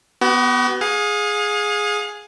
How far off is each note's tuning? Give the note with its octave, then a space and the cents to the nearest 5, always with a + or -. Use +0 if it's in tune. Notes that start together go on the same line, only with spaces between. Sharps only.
B3 +0 F#4 +45
G#4 +0 F5 +40